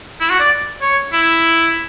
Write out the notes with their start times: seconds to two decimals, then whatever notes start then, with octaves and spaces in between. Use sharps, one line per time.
0.20 E4
0.30 F#4
0.40 D5
0.81 C#5
1.13 E4